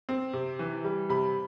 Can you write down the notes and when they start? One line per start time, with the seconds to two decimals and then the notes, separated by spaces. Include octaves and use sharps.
0.09 C4
0.33 C3
0.59 E3
0.84 G3
1.10 C3 B5